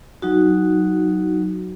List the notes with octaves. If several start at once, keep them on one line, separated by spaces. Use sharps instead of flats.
F#3 D#4 F#4